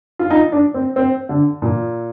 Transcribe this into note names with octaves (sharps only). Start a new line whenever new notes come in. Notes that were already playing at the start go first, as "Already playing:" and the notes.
F4
D#4
D4
C4
C4
D3
A#2